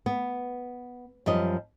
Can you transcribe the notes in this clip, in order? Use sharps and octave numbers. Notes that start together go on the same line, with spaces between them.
B3
F#2 F3 G3 D#5